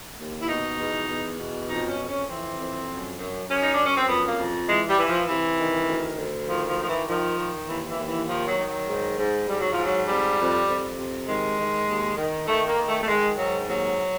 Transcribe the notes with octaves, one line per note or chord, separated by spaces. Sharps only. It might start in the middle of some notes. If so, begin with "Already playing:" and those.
D#2
E4
B2 D#4
E2
E2
B2
F2 D#4
C#4
F2
C#4
E3 C4
F2
F#2
F#2
F#2 C#4
D#4
F#2 D4
C#4
C4
F2 B3
A#3
F2
E3 G#3
G3
E3
F3
C3 E3
D#3
D2
D2
D#3 F3
F3
D#3 F3
E3
D#3 F3
D#3
D#2 E3
E3
D#2
E3
D#3 F3
F#3
D#3
F#3
G#2
G#2
G#2 G3
F#3
G#2 F3
F#3
F2 G3
F2
F2
C3
D#3 G#3
D#3
D#2
D#3
D#3 A3
A#3
D#3
A3
A3
D#3 G#3
G#2 F#3
D#2 F#3